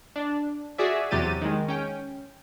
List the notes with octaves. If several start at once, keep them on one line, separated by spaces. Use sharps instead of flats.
D4
F#4 G#4 D5 E5
E2 C3 F#3 G4 A6 D#7
D#3 G#3
C#4 G5